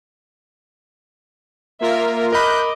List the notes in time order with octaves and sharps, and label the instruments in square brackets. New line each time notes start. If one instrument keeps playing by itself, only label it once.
[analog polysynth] A#3 F4 A#4 [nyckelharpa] E5
[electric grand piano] A#4 B5 [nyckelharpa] D#5 D6 [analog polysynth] F#6 G6